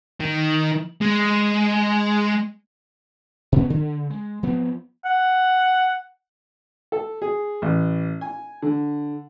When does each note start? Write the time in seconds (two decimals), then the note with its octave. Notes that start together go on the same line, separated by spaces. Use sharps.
0.20 D#3
1.02 G#3
3.52 B2 B3 C#4
3.70 C#3
4.10 G#3
4.43 F3 B3 C4
5.05 F#5
6.92 A4
7.22 G#4
7.62 A1
8.21 G#5
8.62 D3